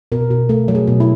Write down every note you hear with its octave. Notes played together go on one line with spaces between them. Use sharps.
B2 A#4
B2
A3 A4
F#3
G#4
B2
E4